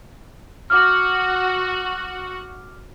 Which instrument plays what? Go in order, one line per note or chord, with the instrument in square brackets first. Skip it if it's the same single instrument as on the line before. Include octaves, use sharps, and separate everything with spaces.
[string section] F#4 [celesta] D6 F6